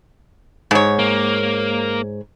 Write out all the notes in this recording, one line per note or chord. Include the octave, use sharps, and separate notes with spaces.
G#2 C#5
A#3